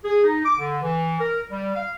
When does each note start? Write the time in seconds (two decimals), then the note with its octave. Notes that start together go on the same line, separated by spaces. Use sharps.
0.05 G#4
0.24 D#4
0.45 D6
0.59 D3
0.82 E3
1.20 A#4
1.51 G3
1.75 F5